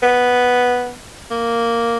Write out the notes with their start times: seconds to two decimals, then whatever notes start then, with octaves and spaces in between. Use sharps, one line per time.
0.02 B3
1.31 A#3